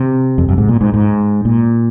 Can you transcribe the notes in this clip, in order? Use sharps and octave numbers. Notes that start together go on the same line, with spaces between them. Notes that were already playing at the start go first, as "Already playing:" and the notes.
Already playing: C3
F2
F#2
G#2
A#2
G#2
G#2
A#2